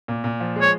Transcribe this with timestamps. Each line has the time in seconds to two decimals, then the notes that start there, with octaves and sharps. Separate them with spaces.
0.08 A#2
0.24 A#2
0.40 F3
0.56 G#3
0.61 C#5